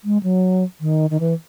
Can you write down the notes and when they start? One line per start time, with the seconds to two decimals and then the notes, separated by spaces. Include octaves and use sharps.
0.04 G#3
0.23 F#3
0.81 D#3
1.10 D#3
1.20 E3